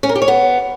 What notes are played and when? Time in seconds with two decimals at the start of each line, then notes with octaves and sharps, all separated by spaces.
0.03 C#4
0.09 A#4
0.16 G4
0.22 C#5
0.28 B3